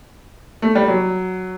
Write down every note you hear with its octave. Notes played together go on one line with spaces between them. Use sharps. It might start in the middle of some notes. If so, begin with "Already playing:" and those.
A3
G3
F#3